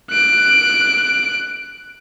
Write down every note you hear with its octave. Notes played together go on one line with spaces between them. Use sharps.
F#6 D7